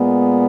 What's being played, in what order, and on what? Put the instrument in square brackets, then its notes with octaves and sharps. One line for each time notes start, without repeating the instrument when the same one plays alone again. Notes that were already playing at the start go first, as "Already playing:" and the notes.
Already playing: [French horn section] A#2 G#3 B3